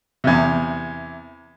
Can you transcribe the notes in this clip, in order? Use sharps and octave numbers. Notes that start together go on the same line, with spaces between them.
E2 C3